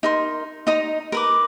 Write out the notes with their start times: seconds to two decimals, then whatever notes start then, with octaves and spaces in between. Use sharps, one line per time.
0.03 D#4 A#4 C6
0.67 D#4 D#5 A#5
1.12 A#4 B4 D6